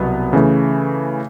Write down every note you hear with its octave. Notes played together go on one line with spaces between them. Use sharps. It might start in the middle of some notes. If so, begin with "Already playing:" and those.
Already playing: C2 B2 F#3 B3
C#3 E3 A3